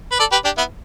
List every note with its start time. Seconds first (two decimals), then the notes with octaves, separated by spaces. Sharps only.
0.11 B4
0.19 A4 D5
0.32 G4 B4
0.44 D4 G4
0.57 B3 E4